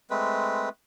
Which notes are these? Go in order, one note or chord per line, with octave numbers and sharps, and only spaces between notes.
G#3 A3 C4 B4